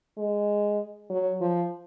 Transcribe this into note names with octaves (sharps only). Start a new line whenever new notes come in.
G#3
F#3
F3